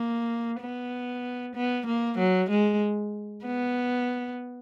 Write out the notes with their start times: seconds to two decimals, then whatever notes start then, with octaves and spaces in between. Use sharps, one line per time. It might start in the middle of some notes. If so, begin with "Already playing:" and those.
Already playing: A#3
0.60 B3
1.55 B3
1.86 A#3
2.19 F#3
2.50 G#3
3.45 B3